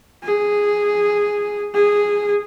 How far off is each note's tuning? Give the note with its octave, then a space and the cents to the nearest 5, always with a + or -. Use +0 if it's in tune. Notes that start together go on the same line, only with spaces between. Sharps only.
G#4 -5
G#4 -10